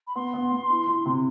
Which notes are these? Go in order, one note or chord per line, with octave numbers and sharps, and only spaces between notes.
B5
B3 C6
B3
B3
E4
E4
C3